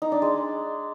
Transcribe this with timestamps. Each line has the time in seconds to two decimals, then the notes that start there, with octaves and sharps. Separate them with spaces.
0.02 D#4
0.12 D4
0.22 G#3